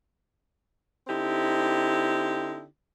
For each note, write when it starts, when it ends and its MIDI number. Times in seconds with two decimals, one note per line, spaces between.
1.08 2.63 50
1.08 2.63 60
1.08 2.63 63
1.08 2.63 64
1.08 2.63 67